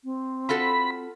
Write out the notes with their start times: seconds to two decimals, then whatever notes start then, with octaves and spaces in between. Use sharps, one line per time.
0.04 C4
0.49 F4 F#4 A4 B5